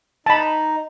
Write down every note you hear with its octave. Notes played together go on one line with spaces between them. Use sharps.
D#4 A5 B5